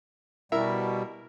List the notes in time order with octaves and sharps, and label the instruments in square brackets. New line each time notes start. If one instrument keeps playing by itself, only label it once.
[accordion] B2 G3 [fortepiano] E4 A#4 E5